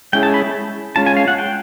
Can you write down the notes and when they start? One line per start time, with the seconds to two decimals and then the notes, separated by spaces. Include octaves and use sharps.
0.13 G#3 C#4 E4 G#4 G5
0.23 A5
0.34 B5
0.96 G#3 C#4 F4 A5
1.06 G#5
1.17 F5
1.28 F#5
1.38 G5